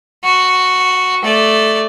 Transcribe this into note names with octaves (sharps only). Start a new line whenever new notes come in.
F#4
A3 D5